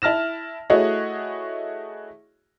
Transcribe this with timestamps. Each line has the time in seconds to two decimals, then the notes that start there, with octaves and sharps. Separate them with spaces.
0.02 E4 A5 F6 A#6 E7
0.70 A3 E4 F#4 G#4 C#5 D#5